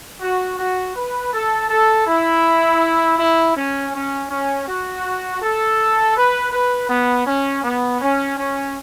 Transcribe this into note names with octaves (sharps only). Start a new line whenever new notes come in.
F#4
F#4
B4
A4
A4
E4
E4
C#4
C#4
C#4
F#4
A4
B4
B4
B3
C#4
B3
C#4
C#4